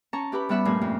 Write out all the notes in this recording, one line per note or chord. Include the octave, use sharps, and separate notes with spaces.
C#4 A5 A#5 C#6
E4 G4 B4 B5
G3 B3 E5 F#5 B5 E6
G2 A#2 F3 A3 G#5
F2